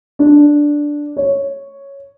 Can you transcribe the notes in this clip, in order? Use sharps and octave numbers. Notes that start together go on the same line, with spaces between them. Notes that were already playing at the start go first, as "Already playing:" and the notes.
D4
C#5